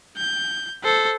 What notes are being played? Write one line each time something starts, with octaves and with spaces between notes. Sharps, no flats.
G6
A4 C5